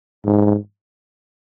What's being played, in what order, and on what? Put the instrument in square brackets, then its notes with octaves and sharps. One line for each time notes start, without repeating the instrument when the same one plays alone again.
[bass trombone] G#2